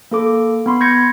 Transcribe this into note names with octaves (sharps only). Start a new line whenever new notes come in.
A#3 A4 D6
B3 B5 C6
C6 G6 G#6 A#6 C#7